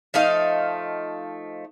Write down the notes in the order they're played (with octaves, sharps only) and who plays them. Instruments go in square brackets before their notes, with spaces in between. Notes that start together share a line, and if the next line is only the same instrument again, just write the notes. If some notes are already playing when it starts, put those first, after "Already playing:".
[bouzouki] F3 A3 D#4 F5